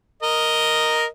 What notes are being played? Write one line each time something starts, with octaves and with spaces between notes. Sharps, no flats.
A#4 D#5